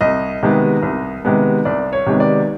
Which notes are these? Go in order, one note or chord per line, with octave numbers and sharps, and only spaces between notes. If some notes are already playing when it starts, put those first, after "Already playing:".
C2 D#5
C3 D#3 G#3 B3
C2
C3 D#3 G#3 B3
C2 D5
C#5
C3 D#3 G#3 B3
D5